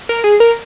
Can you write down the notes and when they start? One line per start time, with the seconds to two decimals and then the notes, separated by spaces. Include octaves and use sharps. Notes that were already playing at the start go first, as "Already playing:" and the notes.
0.09 A#4
0.24 G#4
0.40 A#4